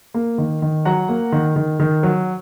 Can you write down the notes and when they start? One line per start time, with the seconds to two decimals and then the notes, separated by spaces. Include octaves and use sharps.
0.14 A#3
0.38 D#3
0.62 D#3
0.85 F#3 F#5 A#5
1.09 A#3
1.32 D#3
1.56 D#3
1.80 D#3
2.03 F#3